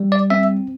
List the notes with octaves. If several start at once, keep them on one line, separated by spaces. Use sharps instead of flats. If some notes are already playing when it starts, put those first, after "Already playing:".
Already playing: G3
D5
C4 E5